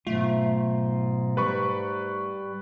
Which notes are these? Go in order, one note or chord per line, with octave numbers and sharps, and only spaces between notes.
B1 G#2 A3 F4
G3 B4 B5 C#6